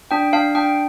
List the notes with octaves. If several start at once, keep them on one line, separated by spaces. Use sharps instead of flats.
D4 G5
D4 F5
D4 G5